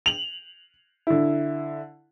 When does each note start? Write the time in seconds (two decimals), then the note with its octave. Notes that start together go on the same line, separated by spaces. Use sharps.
0.06 F7 F#7
1.07 D3 E4